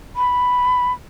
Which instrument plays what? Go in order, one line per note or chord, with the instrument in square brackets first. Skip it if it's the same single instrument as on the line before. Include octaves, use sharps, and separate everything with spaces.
[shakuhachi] B5